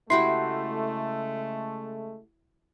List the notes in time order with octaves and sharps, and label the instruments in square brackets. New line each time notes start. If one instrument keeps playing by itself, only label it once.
[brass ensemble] C#3 G#3 A3 [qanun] E4 F#4 G4 [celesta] C6 C7